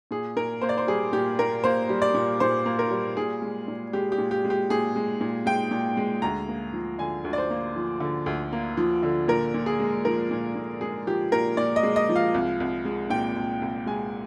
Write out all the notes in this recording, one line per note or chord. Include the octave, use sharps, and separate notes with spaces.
A#2 G#4
A#2 A#4
A#3 C5
D5
C5
G3 G#4
A#2 G4
A#2 A#4
A#3 C5
G3
D5
A#2
A#2 C5
A#3
A#4
G3
A#2 G#4
G#3
A#2
G#3 G4
G4
A#2
G4
G#3
G4
A#2 G#4
G#3
A#2
G#3 G5
A#2
G#3
D2 A#5
A#3
F3
D3 G#5
D2
D5
C5
A#3
F3
D3
D2
A#3
F3
D3
A#2 A#4
A#2
G#4
G#3
F3 A#4
A#2
A#2
G#3 G#4
F3 G4
A#2 A#4
A#2 D5
D#5
G#3
D#5
F3
F5
C2
C2
G#3
A#2 G5
C2
C2
G#3 G#5